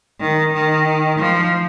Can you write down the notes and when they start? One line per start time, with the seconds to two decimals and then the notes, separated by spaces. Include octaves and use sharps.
0.20 D#3
0.53 D#3
1.18 F3